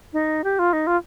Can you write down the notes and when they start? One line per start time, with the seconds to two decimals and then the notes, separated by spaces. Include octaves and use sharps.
0.13 D#4
0.44 G4
0.59 F4
0.73 D#4
0.87 F4